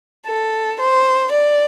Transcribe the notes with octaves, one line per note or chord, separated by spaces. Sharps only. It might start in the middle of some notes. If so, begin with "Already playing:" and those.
A4
C5
D5